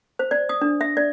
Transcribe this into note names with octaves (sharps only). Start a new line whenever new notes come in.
C5
D5
D#6
D4
E5
D5